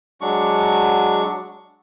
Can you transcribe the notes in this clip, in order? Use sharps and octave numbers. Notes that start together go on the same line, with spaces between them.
F#3 G#3 D4 C#6